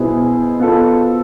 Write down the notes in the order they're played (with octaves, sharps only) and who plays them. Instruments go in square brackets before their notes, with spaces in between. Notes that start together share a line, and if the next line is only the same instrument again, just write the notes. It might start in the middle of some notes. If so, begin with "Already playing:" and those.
Already playing: [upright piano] B2 [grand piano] B3 E4 G#4 C5
[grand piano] B3 F4 A4